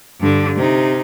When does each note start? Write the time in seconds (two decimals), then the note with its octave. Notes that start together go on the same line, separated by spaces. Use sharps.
0.19 G2 D3
0.56 C3 D#4